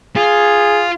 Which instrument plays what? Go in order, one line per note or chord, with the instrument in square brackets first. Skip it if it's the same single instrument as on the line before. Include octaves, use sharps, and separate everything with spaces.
[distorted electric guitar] F4 [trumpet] G#4